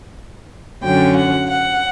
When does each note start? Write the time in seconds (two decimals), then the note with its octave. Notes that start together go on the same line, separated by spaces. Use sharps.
0.83 F#2 D3 F#3 C#4 G5
1.17 F#5
1.50 F#5